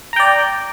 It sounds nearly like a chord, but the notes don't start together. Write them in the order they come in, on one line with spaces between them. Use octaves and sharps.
A#5 G5 D5